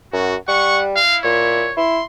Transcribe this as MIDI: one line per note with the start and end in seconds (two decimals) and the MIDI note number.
0.13 0.35 42
0.13 0.36 66
0.48 0.98 55
0.48 0.83 78
0.48 0.78 85
0.96 1.70 64
0.96 1.18 77
1.24 1.69 46
1.24 1.75 73
1.77 2.00 64
1.77 2.05 84